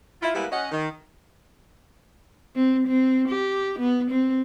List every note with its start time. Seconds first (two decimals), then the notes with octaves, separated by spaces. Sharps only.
0.22 E4 F4
0.35 G3 G#3 A#3 B3 E4 B4
0.52 C#4 D#5 F#5
0.72 D#3
2.55 C4
2.87 C4
3.28 G4
3.79 B3
4.10 C4